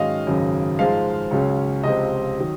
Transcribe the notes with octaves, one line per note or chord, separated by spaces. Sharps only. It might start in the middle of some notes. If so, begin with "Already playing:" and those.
Already playing: G#2 D#3 F#3 C#4 D#5 F5
G#1 F#2 C#3 F#3
G#2 F3 G#3 F5
C#2 C#3 F#3 C#4
C#2 C3 F3 C4 D#5
D#3 F#3